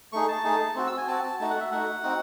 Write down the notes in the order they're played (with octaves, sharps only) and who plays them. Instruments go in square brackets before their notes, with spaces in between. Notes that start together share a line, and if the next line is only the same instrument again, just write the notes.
[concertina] A3 D#4 G#4 C#6
A5
A3 D#4 G#4
C4 F#4
E6
G#5
C4 F#4 A5
A5
A3 D#4 F#4 A5
F#5
E5
A3 D#4 F#4 F#5
C4 D#4 F#4